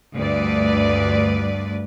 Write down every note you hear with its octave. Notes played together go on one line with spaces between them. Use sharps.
D2 G2 B4 D5